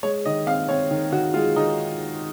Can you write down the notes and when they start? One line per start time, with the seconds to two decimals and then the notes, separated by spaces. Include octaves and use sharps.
0.03 G#3 C#5
0.25 D#3 D#5
0.47 C4 F5
0.69 C4 C#5
0.91 D#3
1.12 D#3 F#4
1.34 G#3 F4
1.56 D#3 D#4